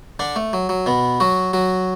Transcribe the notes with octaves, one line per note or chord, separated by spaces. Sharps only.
D3 D4
A3
F#3
F#3
B2 B3
F#3 F#4
F#3 F#4